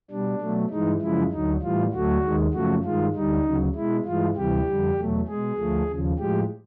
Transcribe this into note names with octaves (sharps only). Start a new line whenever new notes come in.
B2 G3 D4
B2 F#3 A3
G2 E3 G#3 D#4
F#2 C#3 F3 G#3 E4
D2 D3 F#3 D#4
A2 E3 G3 F4
D2 D3 F#3 A3 F#4
D#2 D#3 G#3
F#2 C#3 F3 A3 F#4
G2 D#3 G#3 F4
D2 D3 G3 D#4
D2 C#3 F#3
B2 G#3 E4
G2 E3 G#3 F4
D2 C3 E3 G3 G4
F2 D3 G3
E2 B2 F#3 A3
B2 G#3 G#4
D2 D3 F3 A3
D#2 C#3 F3
A2 F3 G#3 G4